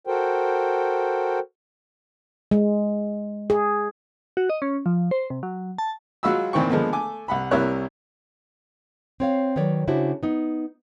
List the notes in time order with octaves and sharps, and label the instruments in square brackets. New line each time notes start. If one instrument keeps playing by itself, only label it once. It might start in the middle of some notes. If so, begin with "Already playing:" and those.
[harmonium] F#4 A4 A#4 C5 G5
[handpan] G#3
G#4
[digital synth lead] F#4
D#5
C#4
F3
C5
C3
F#3
A5
[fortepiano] F#3 G#3 F4 F#4 B5 E6
A#2 D#3 E3 C4 G5 C#6
D3 F3 G#3 A#3 B3
A3 A4 G#5 D6
C2 F#5 B5
C2 C3 E4 A#4 C#5 F#6
[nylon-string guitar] C4 C#5 F5
D#3 F#3 B4 C#5 D5
C#3 D4 E4 F#4 G4 C5
B3 D#4